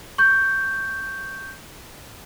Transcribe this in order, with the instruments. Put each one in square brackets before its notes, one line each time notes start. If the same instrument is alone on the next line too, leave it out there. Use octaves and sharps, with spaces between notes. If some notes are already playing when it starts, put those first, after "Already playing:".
[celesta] C#6 G6